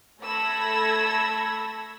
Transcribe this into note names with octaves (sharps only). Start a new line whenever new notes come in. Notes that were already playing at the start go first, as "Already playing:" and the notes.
A3 A4 B5 E6 G#6 A#6